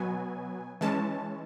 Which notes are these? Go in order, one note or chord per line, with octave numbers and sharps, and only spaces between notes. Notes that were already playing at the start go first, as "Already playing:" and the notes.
Already playing: B2 F#3 B3 G#5
E3 G#3 C#4 A5